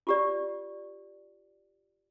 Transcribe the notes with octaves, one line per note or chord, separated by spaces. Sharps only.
F4 G4 D5